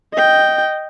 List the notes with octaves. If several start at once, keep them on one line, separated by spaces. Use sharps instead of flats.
D#5 G5